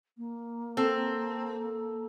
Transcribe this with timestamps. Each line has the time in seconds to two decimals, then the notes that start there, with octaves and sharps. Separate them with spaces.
0.18 A#3
0.77 C4 A4